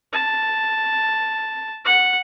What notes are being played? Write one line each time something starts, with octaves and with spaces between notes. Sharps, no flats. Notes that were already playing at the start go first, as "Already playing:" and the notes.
A5
F#5